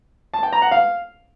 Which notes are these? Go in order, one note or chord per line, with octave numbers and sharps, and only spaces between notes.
A5
G5
A#5
F#5
F5